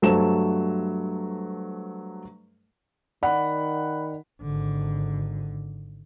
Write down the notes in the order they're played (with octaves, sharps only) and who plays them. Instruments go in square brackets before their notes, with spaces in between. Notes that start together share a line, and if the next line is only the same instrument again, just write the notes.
[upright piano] G2 F#3 A3 A4 C5 E7
[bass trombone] D#3 [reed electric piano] D5 [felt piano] F#5 [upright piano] B5
[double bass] G#1 D3